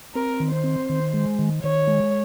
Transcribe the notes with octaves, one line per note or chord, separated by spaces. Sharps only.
C4 A#4
D#3
C5
C4
D#3
G#3
D#3
D#3 C#5
G#3